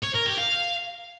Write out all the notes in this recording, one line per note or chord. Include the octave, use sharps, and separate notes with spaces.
C#5
A#4
G4
F5